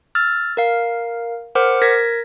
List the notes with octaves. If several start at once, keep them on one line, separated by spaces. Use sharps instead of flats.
E6 F6 A6
A#4 F5
A#4 C5 F#5 D6 F6
A#4 G#6 A#6 B6